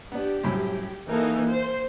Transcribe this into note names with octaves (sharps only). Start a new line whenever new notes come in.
B3 D4 G4
C2 F#2 A2
E3 A#3 D#4 A4 A#4
C5